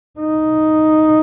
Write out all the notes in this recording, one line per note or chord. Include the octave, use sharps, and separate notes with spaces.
D#4